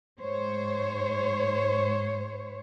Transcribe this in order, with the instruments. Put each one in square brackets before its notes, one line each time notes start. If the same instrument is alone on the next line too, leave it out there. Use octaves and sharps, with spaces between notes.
[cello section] G#2 C5 C#5